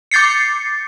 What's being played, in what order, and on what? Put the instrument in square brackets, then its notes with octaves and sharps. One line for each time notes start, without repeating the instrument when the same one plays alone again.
[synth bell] D6 G6 A6 C7 C#7